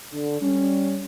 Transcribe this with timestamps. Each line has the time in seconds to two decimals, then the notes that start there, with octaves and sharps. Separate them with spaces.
0.13 D3
0.41 G3 C#4